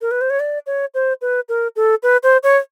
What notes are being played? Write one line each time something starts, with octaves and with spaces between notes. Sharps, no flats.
A#4
B4
C5
C#5
D5
C#5
C5
B4
A#4
A4
B4
C5
C#5